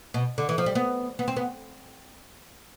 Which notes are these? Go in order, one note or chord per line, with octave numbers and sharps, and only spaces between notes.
B2
D3
E3
F3
G3
B3
B3
C4
B3